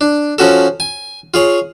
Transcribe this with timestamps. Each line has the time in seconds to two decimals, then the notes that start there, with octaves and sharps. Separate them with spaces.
0.01 D4
0.38 F3 C#4 F#4 A4
0.80 G#5
1.34 F4 G#4 C#5